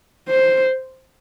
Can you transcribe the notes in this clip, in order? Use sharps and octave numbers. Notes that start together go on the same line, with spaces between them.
C5